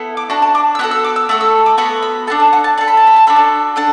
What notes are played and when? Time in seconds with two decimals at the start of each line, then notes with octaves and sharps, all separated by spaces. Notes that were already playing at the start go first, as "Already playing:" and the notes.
Already playing: B3 E4 A4
0.17 D6
0.30 D4 F#4 A4
0.42 A5
0.55 D6
0.75 E6
0.79 B3 F#4 A4 F#6
0.91 E6
1.04 D6
1.16 E6
1.29 A3 F#4 A4 E6
1.41 E6
1.66 D6
1.78 B3 F#4 A4 B5
2.02 B5
2.27 D4 F#4 A4 A5
2.40 A5
2.53 F#5
2.64 A5
2.78 D4 A4 A5
2.88 B5
2.97 A5
3.07 B5
3.16 A5
3.27 D4 F#4 A4 B5
3.36 A5
3.76 D4 A4 F#5